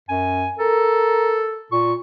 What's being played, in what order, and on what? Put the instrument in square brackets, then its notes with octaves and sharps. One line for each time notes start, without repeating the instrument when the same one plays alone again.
[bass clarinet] F#2 [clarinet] G#5
[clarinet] A4 [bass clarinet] A#4
[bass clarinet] A#2 [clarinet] C#6